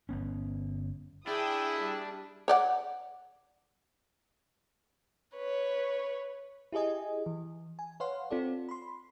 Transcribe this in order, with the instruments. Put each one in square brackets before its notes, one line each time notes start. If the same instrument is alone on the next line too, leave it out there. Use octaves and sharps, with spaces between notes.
[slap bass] G1 B3 C#4
[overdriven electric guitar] D4 [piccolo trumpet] E4 [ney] G#4 [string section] E5 G5 D#6
[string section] G3
[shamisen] C#5 D5 F#5
[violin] B4 C#5
[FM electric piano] E4 G4 G#4 D#5 G#5
E3
G#5
B4 C#5 F5 F#5 C6
C4 F4 A4 D5
B5 C6